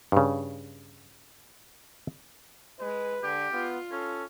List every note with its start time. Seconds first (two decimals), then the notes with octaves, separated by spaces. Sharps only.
0.12 G2 C#3
2.80 G#3 B4
3.23 D3 G4
3.53 B3 F4
3.92 C#4 A4